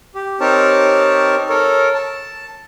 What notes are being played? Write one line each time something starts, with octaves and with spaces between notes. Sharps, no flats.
G4
C4 D#4 G4 A#4 C#5 A5
A4 A#4 C#5
A5